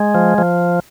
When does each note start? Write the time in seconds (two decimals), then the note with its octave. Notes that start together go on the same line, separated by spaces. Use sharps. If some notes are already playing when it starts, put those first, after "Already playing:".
Already playing: G#3
0.15 F3
0.38 F3